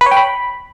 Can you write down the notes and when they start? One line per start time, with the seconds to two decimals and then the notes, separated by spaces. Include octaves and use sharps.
0.01 B4
0.06 C#5
0.11 G5
0.17 B5